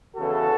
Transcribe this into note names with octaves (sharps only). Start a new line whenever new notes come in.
E2 C#3 E3 F#4 A4